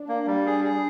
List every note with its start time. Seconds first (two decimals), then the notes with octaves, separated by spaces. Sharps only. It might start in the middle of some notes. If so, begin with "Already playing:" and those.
Already playing: D4
0.08 A#3
0.27 G3
0.46 G#4
0.64 G#4